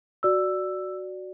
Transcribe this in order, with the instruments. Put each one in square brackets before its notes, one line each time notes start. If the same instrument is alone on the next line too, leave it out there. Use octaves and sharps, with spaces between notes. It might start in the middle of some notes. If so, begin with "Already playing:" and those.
[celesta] F#4 D5 E6